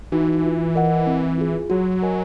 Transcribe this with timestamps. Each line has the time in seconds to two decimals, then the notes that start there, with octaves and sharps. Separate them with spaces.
0.12 E3 D#4 F#4
0.44 F4
0.75 A#4 D#5 F#5
1.07 C4
1.38 F4 G#4
1.70 F#3 F#4
2.02 A#4 D#5 G#5